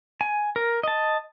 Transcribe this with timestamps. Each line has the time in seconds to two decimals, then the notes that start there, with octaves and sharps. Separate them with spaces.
0.21 G#5
0.56 A#4
0.83 D#5 A5